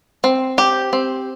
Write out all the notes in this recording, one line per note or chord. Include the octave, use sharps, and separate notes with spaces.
C4
G4
C4